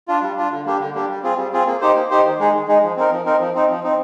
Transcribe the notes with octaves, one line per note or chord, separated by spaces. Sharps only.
D4 F4
G3
D4 F4
D3
G3 A#3 D4 G4
D3
G3 A#3 D4 G4
G3
C4 F4 G#4
G3
C4 F4 G#4
A#3
D#4 G4 C5
A#3
D#4 G4 C5
D#3
G#3 D#4 G#4
D#3
G#3 D#4 G#4
F3
C4 D#4 A#4
F3
C4 D#4 A#4
F3
C4 D#4
F3
C4 D#4